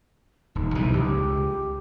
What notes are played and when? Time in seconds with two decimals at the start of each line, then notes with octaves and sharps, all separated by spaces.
0.55 D#1 D#4
0.75 B1 E3 G3
0.93 C#2 G4